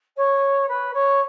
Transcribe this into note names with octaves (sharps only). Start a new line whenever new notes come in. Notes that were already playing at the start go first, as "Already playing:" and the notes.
C#5
B4
C#5